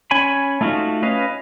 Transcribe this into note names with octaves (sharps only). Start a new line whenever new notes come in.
C#4 C#5 G#5 B5
A3 D#4 F4 F#4
C#4 B4 D#5 F5